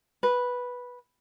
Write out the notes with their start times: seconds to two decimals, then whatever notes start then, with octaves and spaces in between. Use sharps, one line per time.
0.23 B4